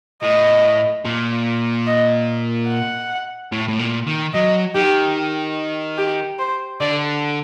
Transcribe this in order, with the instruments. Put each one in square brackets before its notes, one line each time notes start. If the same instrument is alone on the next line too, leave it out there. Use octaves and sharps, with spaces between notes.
[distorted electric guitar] A2 [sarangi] D#5
[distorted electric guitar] A#2
[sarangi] D#5
F#5
[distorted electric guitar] A2
A2
A#2
D#3
[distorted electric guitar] F#3 [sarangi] D#5
[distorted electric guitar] D#3 [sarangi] G4
[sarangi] G4
C5
[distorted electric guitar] D3 [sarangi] D5